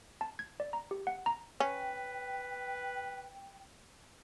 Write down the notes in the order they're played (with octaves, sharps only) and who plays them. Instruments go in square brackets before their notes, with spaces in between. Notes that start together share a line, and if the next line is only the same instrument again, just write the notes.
[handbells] A5
G#6
D5
A#5
G4
F#5
A#5
[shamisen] C#4 [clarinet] B4 [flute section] G5